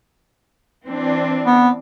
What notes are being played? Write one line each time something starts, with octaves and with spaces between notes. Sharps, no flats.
E3 C4 D4
B3